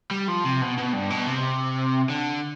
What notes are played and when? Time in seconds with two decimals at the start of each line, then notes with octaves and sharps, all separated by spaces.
0.11 G3
0.28 F3
0.45 C3
0.61 B2
0.78 B2
0.94 G2
1.11 B2
1.27 C3
2.09 D3